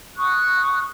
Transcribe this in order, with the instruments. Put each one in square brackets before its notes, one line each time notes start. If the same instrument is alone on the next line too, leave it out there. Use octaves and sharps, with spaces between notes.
[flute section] C#6 D#6 F#6